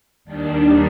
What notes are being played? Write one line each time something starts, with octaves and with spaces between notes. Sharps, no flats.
D#2 D#3 G3 D4